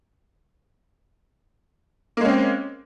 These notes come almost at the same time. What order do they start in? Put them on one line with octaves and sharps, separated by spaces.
A#3 G#3 C#4 C4